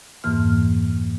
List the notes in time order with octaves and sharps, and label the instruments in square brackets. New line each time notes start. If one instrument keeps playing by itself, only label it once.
[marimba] F2 G#2 E3 A#3 F6